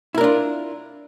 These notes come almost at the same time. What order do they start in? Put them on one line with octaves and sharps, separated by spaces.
E4 A#4 D4 F4